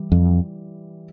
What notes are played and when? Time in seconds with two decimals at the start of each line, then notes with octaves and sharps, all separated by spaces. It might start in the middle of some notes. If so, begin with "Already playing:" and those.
Already playing: E3 G3
0.12 F2